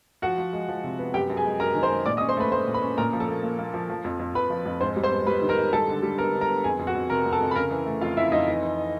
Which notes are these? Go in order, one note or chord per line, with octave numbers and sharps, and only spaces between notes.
F3 F#4 F#5
F3
G#3
F3
C3
B3
F#2 G4 G5
F#2
G#4 G#5
G#3
F#2 A#4 A#5
D#3
C5 C6
G#3
A#2 D5 D6
D#5 D#6
C#4
C5 C6
A3 B4 B5
A3 C5 C6
A#2
B4 B5
C#4
A#2 A#4 A#5
F3
A4 A5
A#3
A#3
A#3
F3
F3
F2
F2
F2 B4 B5
F3
F2
G#2 C5 C6
G3
C5 C6
B3
G3 B4 B5
D#3
A#4 A#5
G#2
G3 A4 A5
D3
G3
B3 A#4 A#5
D3
A#4 A#5
B3
F2 G#4 G#5
F2
F#4 F#5
F2
C3 A#4 A#5
F2
A4 A5
F2
B5
C#3 A#4 A#5
E3
A3
F2 F4 F5
F2 E4 E5
F2 D#4 D#5
E3
E3